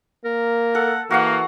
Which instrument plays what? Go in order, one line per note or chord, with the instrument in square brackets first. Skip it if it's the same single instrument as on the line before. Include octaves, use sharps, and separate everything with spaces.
[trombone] A#3 [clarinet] A#4
[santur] A4 [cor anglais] F#5
[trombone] E3 [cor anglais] A#3 [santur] F#4 F5 F#5